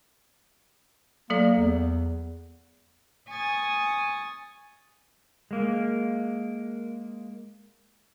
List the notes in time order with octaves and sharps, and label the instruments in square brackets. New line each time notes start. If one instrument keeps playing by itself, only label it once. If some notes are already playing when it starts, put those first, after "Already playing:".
[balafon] F#3 A4 D5 [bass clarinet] A#3
[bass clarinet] E2
[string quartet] G#5 C#6 D#6 G#6 A6
[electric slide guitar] G#3 A#3